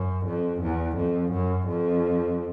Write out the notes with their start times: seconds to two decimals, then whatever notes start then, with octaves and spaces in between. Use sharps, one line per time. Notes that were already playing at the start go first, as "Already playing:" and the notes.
Already playing: F#2
0.26 F2
0.62 E2
0.97 F2
1.33 F#2
1.68 F2